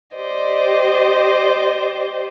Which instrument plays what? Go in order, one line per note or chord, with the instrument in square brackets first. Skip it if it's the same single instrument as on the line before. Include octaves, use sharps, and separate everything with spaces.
[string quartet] G4 C5 D5 D#5